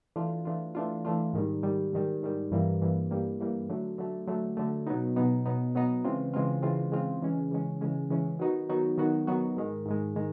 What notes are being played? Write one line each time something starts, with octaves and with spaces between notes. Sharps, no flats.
E3 A3 D4 F4
E3 A3 D4 F4
E3 A3 D4 F4
E3 A3 D4 F4
G#2 D#3 G3
G#2 D#3 G3
G#2 D#3 G3
G#2 D#3 G3
G2 E3 G3 A#3
G2 E3 G3 A#3
G2 E3 G3 A#3
G2 E3 G3 A#3
D3 F#3 A3
D3 F#3 A3
D3 F#3 A3
D3 F#3 A3
B2 F#3 B3 D#4
B2 F#3 B3 D#4
B2 F#3 B3 D#4
B2 F#3 B3 D#4
C#3 E3 G#3 C4 F4
C#3 E3 G#3 C4 F4
C#3 E3 G#3 C4 F4
C#3 E3 G#3 C4 F4
C#3 E3 G#3 C#4
C#3 E3 G#3 C#4
C#3 E3 G#3 C#4
C#3 E3 G#3 C#4
D#3 F#3 B3 D#4 F#4
D#3 F#3 B3 D#4 F#4
D#3 F#3 B3 D#4 F#4
D#3 F#3 B3 D#4 F#4
G#2 D#3 G#3
G#2 D#3 G#3
D#3 G#3